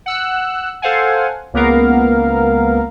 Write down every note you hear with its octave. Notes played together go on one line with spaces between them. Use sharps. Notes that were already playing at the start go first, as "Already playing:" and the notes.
F#5 E6 F#6
A4 C5 F5 F#5 G#5
C#2 A#3 B3 A#4 F5